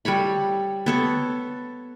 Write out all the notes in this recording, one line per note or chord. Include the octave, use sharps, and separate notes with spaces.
G3 A4 C#5 B5
B3 A4 C#5